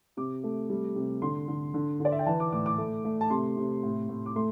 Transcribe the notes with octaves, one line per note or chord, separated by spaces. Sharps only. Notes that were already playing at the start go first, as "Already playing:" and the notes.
C3 D6
A3
G3
C3
D3 C6
D3
D3
D3
D5
E5
G5
E3 A5
D6
A2 D6
D6
A3
A3
A5
C3 C6
C3
A2
A2
D6
A3 C6